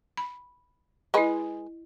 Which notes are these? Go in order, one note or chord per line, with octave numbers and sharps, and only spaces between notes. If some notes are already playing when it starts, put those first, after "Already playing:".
B5
G#3 E4 G#4 B4 D#5